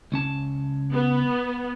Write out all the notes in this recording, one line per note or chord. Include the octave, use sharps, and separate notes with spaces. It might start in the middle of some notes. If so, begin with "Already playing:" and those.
C#2 C#4 A5
B3